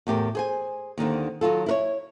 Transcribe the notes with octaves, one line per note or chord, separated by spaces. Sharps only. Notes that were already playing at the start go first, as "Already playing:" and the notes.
E2 A2 G4 A#4
G#4 C5 G#5
D#2 D3 D#3 C4
D#3 F#3 F4 A4
E4 A#4 C#5